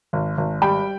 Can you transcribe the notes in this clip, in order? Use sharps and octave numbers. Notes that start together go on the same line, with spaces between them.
G#1
G#1
G3 G5 B5